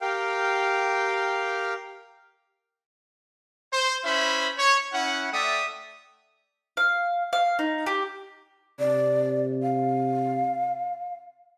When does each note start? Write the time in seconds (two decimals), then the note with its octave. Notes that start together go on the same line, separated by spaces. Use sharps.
0.01 G4 A#4 F5 G5
3.73 C5
4.04 C#4 E4 C5 E5 B5
4.58 C#5
4.93 C#4 E4 F#5
5.33 A3 D5 E5 G5 D#6
6.77 F5
7.33 F5
7.59 D#4
7.86 G4
8.79 C3 D5
9.62 F5